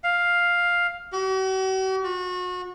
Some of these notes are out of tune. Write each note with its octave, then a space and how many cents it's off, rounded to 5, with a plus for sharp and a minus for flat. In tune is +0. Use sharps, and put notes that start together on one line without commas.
F5 +5
F#4 +45
F#4 -35